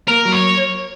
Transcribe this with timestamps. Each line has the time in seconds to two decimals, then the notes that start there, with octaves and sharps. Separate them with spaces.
0.08 A#3 A#4
0.25 F#3
0.32 C#5